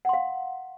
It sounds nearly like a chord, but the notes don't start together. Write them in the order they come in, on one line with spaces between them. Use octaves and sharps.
F#5 C6 F5